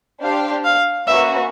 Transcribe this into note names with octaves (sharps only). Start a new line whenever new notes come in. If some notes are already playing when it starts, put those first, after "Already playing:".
D4 G4 C5 F5
F5
A#3 C#4 F#4 B4 E5